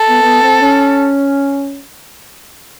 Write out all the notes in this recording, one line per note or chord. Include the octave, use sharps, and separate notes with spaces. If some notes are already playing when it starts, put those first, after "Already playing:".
Already playing: A4
B3
B3
C4
C#4